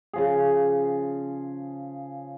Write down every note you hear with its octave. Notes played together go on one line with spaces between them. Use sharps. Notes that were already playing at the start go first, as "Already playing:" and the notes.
C#3 F3 G#4